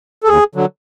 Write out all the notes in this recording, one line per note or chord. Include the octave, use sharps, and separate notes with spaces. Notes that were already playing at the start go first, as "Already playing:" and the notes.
A4
D#2 G#4
D3 F#3